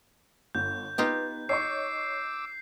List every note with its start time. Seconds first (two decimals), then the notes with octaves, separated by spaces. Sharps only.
0.55 G1 G6
0.98 B3 D#4 F4 G4
1.49 C#5 D#5 C#6 D6 E6 C7